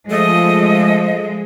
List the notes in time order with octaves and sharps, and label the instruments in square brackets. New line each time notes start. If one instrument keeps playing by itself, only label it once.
[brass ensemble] F3 [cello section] G#3 [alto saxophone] A3 [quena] D#5